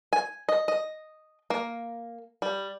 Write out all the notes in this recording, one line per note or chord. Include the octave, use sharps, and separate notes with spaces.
G#5
D#5
D#5
A#3
G3